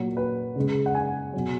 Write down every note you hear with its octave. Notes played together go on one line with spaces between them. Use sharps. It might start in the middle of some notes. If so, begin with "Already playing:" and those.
Already playing: A#2 F#3
B4
C#3 G#3
F#5
G#5
B2 F#3